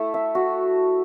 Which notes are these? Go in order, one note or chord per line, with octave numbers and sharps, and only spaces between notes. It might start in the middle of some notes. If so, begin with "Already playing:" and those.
Already playing: A3 E4 A4
E5
F#4